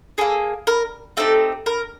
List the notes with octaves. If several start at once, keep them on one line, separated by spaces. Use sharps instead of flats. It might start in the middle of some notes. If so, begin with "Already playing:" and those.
A#3 D#4 G#4 A4
A#4
A3 C4 D#4 G4 A4
A#4